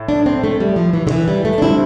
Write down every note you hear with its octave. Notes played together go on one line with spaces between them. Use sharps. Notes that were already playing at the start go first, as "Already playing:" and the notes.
Already playing: A2
D4
C4
A3
G3
F3
E3
D3
E3
G3
A3
D4
D3 G3 C4 E4